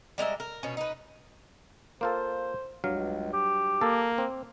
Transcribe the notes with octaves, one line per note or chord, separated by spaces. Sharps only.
G3 G#3 A#4 E5
A#4
B2 C#4
D#4 B4
A#3 F4 A4 C5
C#2 G2 F#3 F5
G4
A#3 A4
C4